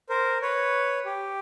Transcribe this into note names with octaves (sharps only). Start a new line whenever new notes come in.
A#4 C5
B4 C#5
G4